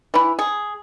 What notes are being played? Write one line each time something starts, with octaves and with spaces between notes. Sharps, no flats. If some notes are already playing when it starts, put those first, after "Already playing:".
E3 E4
G#4